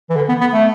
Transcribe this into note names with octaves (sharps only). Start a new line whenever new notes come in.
E3
D3
B3
B3
A3